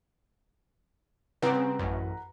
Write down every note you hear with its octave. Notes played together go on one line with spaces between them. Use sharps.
C#3 G3 C4 B4 F#5 A#5
A1 F#2